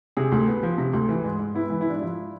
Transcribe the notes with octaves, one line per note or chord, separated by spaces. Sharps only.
C3 G#4
D2
B3
F3
C3
D2
E3
G#2
G#2
B3 E4
E3 E4
E4
G#2 D4
D4
F3 E4